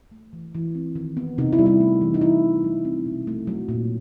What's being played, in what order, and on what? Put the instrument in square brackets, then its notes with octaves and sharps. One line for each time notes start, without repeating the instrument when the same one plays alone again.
[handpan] A3
E3
E3
C4
D#3
B3
C3 D#4
E4
G3
E4
A3
E3
D#4
E3 E4
C#4
F#3
C4
B2
A3
F#3
A#2